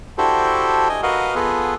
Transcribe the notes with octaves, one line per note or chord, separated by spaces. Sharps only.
D4 E4 F#4 G4 A4 C5
D#5 G#5
F#4 A#4 B4 D#5 F5 F#5
B3 F4 G#4 A4 B4